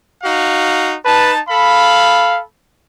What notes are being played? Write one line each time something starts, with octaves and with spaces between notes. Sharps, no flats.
D#4 F#4 F5
D#4 B4 A5
A4 F5 B5